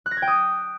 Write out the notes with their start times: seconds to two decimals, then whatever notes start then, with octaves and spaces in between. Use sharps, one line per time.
0.06 F#6
0.11 A#6
0.17 G#6
0.22 G5
0.28 D#6